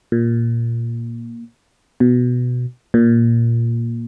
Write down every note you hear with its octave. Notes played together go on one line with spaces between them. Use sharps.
A#2
B2
A#2